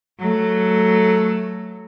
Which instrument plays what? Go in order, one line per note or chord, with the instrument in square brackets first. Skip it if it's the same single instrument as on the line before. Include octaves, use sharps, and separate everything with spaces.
[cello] F#3 A3